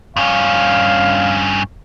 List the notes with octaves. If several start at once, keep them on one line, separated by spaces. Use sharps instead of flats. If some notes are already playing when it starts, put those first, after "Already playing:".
G2 C#4 F5